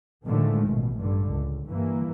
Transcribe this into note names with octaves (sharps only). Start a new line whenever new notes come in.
A2 D3 D#3 F3 G#3 A3
A1 B2
G2 D3
C#2
G2 E3 A#3